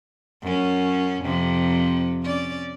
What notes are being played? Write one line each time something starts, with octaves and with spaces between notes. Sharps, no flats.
F#2 C#4
F2 C3
C#4 D5